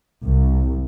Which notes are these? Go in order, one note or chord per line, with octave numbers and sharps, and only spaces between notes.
C2